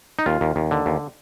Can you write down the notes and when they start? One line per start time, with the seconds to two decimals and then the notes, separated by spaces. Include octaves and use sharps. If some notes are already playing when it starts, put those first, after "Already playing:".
0.19 D#4
0.26 D#2 F4
0.41 D#2
0.56 D#2
0.71 D3
0.86 D#2